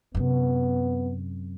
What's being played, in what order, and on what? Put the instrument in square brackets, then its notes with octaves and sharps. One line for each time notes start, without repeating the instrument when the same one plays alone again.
[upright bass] F#2 C3 [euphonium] B3